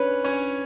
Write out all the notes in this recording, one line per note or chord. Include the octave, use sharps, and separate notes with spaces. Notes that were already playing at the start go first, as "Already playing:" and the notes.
Already playing: C#4 D4 B4 C#5
C#4 C#5